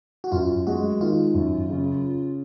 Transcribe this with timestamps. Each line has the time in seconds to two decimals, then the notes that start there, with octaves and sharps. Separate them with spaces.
0.24 F#4
0.32 F#2 F4
0.67 G#3 F#4
1.00 D#3 F4
1.34 F#2
1.69 C#3